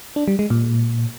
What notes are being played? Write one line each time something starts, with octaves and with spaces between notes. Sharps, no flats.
D4
G3
G#3
A#2